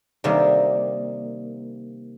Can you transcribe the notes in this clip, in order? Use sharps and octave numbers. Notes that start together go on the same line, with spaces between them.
C3 D#3 G3 A#3